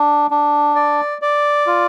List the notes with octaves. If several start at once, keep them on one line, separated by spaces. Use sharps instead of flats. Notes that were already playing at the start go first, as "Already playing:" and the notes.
Already playing: D4
D4
D5
D5
F4